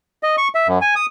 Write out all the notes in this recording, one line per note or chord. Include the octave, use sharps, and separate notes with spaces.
D#5
C#6
E5
F#2
G#5
D#6